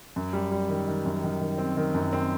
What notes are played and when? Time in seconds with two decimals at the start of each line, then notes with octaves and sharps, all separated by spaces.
0.16 F#2
0.33 G3
0.51 G3
0.69 D#3
0.88 D#3
1.06 F#2
1.24 D#3
1.41 D#3
1.58 C4
1.77 D#3
1.95 F#2
2.13 C4